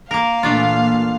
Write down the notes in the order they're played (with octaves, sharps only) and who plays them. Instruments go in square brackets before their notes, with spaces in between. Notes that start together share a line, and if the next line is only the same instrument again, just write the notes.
[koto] A#3 A#4 [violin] F5
[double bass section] A#2 E3 A#3 [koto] A3 D4 F4